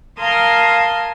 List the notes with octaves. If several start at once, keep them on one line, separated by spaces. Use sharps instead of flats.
A#4 F5 A5 C6 D#6 G#6